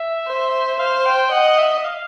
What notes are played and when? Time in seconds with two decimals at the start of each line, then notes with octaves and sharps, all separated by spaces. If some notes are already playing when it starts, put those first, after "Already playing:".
Already playing: E5
0.27 C5
0.79 C5 F5
1.06 G5
1.31 D#5 F#5
1.58 E5
1.84 F5